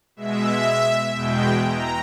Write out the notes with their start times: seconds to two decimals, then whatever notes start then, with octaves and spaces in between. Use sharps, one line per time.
0.16 B2 G#3 E5
1.15 E2 B2 G#3 G5
1.64 A#5